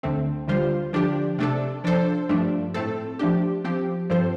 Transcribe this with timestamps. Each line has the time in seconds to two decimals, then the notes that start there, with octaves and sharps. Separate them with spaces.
0.03 D2 D3 A3 C4
0.47 D2 D3 G3 F4 C5
0.93 D3 F3 D4 G4
1.38 C3 A3 D4 A4
1.84 F3 D4 A4 C5
2.29 G2 F3 A3 D4
2.74 A2 A3 C4 A4
3.19 F3 A3 D4 G4
3.64 F3 C4 G4
4.10 G2 F3 C4 A4 C5